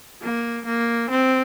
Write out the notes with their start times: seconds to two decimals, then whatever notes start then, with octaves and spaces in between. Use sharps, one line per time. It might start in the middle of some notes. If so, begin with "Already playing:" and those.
0.23 A#3
0.66 A#3
1.10 C4